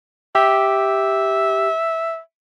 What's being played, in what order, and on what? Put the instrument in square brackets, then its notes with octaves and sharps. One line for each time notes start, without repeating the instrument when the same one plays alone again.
[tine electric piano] G4 [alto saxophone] E5